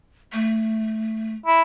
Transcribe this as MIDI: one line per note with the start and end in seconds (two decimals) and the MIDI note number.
0.33 1.34 57
1.46 1.62 64